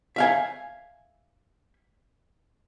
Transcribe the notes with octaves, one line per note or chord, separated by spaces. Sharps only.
E5 F5 G#5